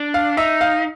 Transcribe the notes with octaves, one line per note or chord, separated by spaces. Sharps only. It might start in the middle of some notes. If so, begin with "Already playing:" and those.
Already playing: D4
F5
D#4 E5
F5